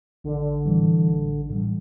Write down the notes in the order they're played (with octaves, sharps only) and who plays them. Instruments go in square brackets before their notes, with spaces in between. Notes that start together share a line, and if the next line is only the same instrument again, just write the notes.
[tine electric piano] A1 [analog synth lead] D3
[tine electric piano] A2 E3 G3
A1
A2 E3 G3